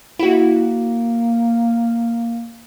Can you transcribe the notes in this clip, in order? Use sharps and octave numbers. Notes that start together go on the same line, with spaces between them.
A#3 E4 F#4